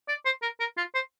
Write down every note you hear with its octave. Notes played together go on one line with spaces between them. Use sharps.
D5
C5
A#4
A#4
F4
C5